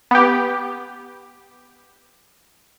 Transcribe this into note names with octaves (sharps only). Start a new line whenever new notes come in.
B3 G4